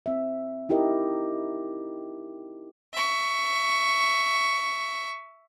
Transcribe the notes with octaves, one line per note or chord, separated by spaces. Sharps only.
C4 E5
D#4 E4 G4 A#4 D#5
E5 C#6